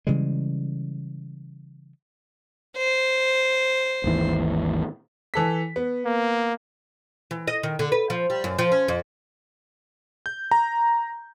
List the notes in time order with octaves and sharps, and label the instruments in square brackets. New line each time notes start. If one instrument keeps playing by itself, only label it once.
[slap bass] C#3 E3 G3 G#3
[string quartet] C5
[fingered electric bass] G#1 D#2 E3
[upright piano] E3 A4 B6
B3
[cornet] A#3
[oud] E3
D#5
D#3
D3
B4
F3
G3
F#2
F3
C#4
F2
[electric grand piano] G6
A#5